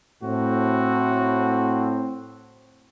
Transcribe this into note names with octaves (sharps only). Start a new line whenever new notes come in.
A2 C4 F#4